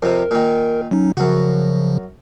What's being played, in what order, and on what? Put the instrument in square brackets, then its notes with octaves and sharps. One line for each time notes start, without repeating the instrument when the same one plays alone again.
[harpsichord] F2 C3 [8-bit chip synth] A#4
[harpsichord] A#2 D#3
[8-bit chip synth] F#3 C#4 D#4
[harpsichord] F#2 F#4 [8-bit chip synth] C#3 F3